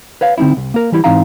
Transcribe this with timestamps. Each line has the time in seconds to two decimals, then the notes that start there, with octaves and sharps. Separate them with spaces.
0.21 B4 C#5 F5
0.38 D3 C4 C#4 D#4 E4
0.57 C2
0.74 A#3 A#4
0.92 E3 G3 E4
1.04 G#2 E3 C4 D#4 F5 A#5